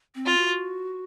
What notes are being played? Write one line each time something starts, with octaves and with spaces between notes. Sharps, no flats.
C4
F4
F#4